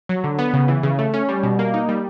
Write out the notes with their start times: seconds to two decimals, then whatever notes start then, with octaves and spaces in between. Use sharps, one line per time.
0.09 F#3
0.24 D3
0.39 B3
0.53 C#3
0.68 E3
0.83 C#3
0.99 A3
1.14 C#4
1.28 G3
1.43 B2
1.59 A#3
1.74 D#4
1.89 G3